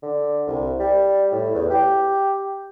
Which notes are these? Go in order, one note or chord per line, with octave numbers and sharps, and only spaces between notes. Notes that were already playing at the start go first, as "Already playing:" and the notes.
D3
C2
G3
A2
E2
G4